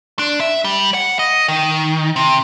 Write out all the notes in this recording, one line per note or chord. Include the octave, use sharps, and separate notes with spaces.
D4
E5
G3
F#5
D#5
D#3
C3